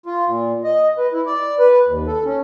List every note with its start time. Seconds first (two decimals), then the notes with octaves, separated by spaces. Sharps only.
0.06 F4
0.27 A#2
0.64 D#5
0.98 B4
1.13 E4
1.26 D5
1.59 B4
1.86 D#2
2.07 A4
2.25 C#4